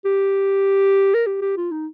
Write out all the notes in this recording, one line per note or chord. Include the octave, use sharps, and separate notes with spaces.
G4
A#4
G4
G4
F4
D#4